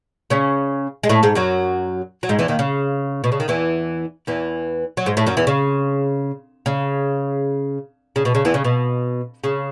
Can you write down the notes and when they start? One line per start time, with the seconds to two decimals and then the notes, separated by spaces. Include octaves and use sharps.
0.30 C#3 C#4
1.03 G#3
1.09 A2 A3
1.23 G#2 G#3
1.35 F#2 F#3
2.23 F#3
2.29 G#2 G#3
2.39 E2 E3
2.48 D#2 D#3
2.59 C#3
3.24 B2
3.32 C#3
3.40 D#3
3.48 E2 E3
4.27 E2 E3
4.97 F#3
5.06 G#2 G#3
5.17 A2 A3
5.26 F#2 F#3
5.37 E2 E3
5.47 C#3
6.66 C#3
8.16 C#3
8.25 B2
8.35 C#3
8.45 E2 E3
8.54 C#3
8.65 B2
9.44 C#3